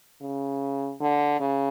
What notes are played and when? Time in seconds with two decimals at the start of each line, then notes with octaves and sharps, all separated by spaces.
0.21 C#3
1.01 D3
1.40 C#3